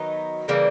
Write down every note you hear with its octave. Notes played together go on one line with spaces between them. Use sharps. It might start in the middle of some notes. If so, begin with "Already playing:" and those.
Already playing: D#3 F#3 B3 D#4
C#3 E3 G3 A#3